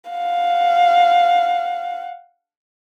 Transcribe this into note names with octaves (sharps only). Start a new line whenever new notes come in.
F5 F#5